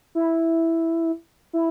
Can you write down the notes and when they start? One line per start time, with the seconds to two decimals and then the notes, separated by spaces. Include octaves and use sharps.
0.15 E4
1.53 E4